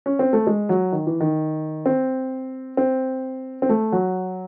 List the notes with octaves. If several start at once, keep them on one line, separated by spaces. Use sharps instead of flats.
C#4
C4
A3
G#3
F#3
D#3
E3
D#3
C4
C4
C4
A3
F#3